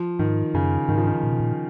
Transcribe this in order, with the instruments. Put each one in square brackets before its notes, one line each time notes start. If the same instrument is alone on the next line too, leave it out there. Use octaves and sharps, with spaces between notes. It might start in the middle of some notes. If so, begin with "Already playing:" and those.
Already playing: [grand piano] F3
[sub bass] G#2 [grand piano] D#3
[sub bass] F#2 [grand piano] C#3
[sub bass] G#2 [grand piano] D#3
[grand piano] F3
D#3
[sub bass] A#2
B2
A#2